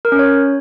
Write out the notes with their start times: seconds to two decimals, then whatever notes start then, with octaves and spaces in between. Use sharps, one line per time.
0.05 A#4
0.12 C#4
0.19 C#5